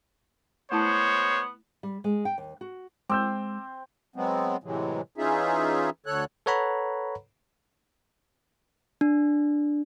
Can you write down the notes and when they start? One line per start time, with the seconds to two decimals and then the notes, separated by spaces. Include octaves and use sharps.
0.72 G#3 A3 B3 E4 C5 C#5 A5
1.83 G3
2.04 G#3
2.25 G5
2.38 D#2
2.61 F#4
3.10 G#3 C4 D6 E6 G6
4.16 F#3 G#3 B3 C4
4.64 A2 C3 E3 F#3 G#3
5.18 E3 C#4 D#4 F4 G#4 E5
6.06 D2 D3 A4 C#5 F#6
6.46 A4 B4 C#5 F#5 A#5 B5
9.01 D4